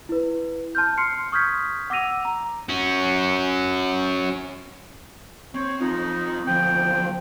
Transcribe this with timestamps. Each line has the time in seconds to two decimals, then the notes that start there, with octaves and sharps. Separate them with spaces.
0.09 E4 B4
0.75 A5 C6 F6 G6
0.98 C6 F6 C7 C#7
1.32 C#6 D#6 F6 G6 G#6 B6
1.90 F#5 D6 E6 A#6 D#7 F7
2.25 A#5
2.69 C#4 F#4
5.55 C4 C#5
5.80 C4 D#4 F4
6.47 D2 F3 G5